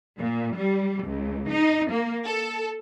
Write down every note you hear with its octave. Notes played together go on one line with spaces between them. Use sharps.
A#2
G3
C#2
D#4
A#3
A4